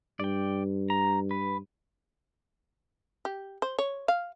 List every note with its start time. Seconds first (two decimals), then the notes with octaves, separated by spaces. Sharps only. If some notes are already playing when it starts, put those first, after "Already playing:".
0.20 G2 D5 G5
0.90 A#5
1.31 B4
3.25 G4
3.62 C5
3.79 C#5
4.08 F5